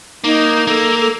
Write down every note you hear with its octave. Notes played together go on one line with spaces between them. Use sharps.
A#3 D#4
A#3 A4
A4